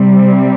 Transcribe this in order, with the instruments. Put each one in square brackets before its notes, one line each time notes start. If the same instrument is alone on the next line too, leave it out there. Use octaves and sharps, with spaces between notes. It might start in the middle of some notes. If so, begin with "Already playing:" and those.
Already playing: [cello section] C3 G3 C4